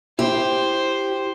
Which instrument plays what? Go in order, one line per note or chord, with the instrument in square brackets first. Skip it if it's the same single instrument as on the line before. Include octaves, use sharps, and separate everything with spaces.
[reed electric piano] E4 [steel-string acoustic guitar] G4 [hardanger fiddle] C5